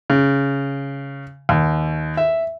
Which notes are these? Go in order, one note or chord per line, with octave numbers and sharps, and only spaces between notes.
C#3
D#2
E5